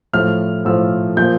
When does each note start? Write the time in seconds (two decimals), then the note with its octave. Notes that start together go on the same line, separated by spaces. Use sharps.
0.13 A2 F3 F6
0.65 A2 F3 E6
1.17 A#2 F3 G6